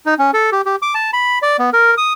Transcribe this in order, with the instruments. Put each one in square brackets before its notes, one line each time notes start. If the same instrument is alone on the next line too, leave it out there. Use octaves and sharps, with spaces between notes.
[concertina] D#4
C#4
A4
G4
G4
D6
A5
B5
D5
B3
A#4
D#6